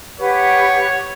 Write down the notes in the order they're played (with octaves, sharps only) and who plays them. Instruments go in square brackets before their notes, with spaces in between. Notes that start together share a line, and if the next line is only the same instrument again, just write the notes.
[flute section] G4 B4 F#5 [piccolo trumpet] C#5